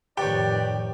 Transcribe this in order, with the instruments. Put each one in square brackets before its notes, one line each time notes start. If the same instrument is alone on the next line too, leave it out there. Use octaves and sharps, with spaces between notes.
[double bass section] F2 A2 D#3 [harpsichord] G4 C#5 [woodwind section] B4 D5 [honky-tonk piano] G5